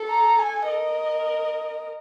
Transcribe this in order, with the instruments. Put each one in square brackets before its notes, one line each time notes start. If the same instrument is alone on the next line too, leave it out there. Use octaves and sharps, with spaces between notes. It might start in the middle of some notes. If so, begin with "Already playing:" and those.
Already playing: [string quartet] A4
[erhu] A#5
G#5
[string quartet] A#4 [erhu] D#5